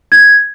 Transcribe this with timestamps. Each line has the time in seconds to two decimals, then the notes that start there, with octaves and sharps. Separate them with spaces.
0.12 G#6